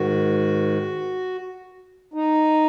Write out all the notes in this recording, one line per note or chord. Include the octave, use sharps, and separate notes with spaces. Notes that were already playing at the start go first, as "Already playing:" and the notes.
Already playing: G#2 D#3 F#4
D#4